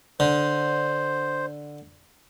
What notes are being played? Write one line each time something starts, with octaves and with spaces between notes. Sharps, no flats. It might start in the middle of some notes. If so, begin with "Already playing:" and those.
D3 C5